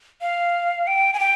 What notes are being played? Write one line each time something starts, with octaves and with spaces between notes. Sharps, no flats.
F5
G5
G#5
G5